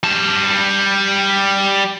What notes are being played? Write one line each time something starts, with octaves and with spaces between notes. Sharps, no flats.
G3 A5